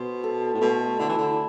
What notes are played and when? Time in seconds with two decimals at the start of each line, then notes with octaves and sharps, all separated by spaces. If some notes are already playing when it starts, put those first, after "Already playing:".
Already playing: B2 C5
0.24 A4
0.54 A2
0.61 B2 A3
0.99 D3 E4
1.09 E3
1.18 D3